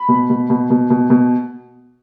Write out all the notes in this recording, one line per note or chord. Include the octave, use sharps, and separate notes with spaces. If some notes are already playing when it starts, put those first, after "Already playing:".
Already playing: B5
B2
B2
B2
B2
B2
B2